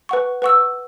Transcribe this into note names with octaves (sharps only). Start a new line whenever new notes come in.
B4 F#5 C#6
B4 F#5 C#6 E6